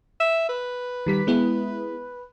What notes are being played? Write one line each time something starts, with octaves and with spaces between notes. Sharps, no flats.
E5
B4
D#3 G3 B6
G#3 B3 E4